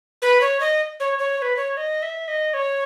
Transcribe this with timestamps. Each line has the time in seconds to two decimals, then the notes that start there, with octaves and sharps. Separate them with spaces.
0.22 B4
0.41 C#5
0.60 D#5
1.00 C#5
1.19 C#5
1.37 C#5
1.42 B4
1.57 C#5
1.77 D#5
2.02 E5
2.28 D#5
2.54 C#5